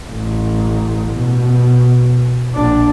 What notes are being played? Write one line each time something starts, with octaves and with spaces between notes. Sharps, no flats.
A1
B2
A#1 D4